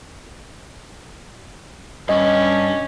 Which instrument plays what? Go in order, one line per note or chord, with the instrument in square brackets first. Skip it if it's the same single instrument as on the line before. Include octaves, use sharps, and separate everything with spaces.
[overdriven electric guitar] G2 [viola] C#4 [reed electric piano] D#5